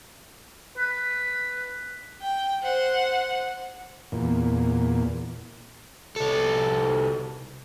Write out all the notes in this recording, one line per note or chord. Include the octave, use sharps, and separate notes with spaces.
B4
G5
C5 F#5
E2 A#2
C2 A4